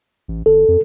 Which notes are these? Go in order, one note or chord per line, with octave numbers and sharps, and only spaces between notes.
A1
G1 A4
F2